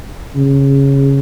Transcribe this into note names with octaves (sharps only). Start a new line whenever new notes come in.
C#3